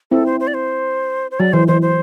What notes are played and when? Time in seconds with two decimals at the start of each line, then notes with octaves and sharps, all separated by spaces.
0.11 C4 E4 A4
0.26 C5
0.40 C5
0.47 D5
0.54 C5
1.31 C5
1.40 F#3 D5
1.53 E3 C5
1.68 E3 C5
1.82 C5